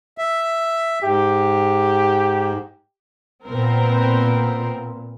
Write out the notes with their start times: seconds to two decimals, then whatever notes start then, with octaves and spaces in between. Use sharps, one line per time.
0.18 E5
1.03 G#2 G4
3.46 A#2 B3 C4 A#4